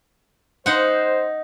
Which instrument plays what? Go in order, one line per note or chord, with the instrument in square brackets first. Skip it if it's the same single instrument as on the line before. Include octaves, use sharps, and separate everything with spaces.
[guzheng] D#4 F#5 [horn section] C5